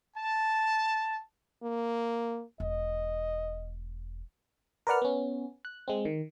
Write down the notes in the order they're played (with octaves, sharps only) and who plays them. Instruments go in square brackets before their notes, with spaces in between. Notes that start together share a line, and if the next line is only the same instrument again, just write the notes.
[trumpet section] A5
[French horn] A#3
[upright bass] E1 [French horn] D#5
[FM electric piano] A#4 B4 D5 F#5 F6
B3 C#4
F#6
G#3 C4
D#3